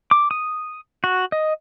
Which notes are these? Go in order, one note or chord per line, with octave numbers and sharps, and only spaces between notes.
D6
D#6
F#4
D#5